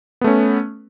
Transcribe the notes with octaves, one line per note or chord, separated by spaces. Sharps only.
A3 B3 C#4